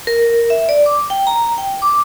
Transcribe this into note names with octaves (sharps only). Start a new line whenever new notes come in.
A#4
E5
D5
D6
G5
A#5
G5
D6